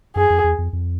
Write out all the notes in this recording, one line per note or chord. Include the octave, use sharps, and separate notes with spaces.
F#2 G#4
F2
E2
F2
F2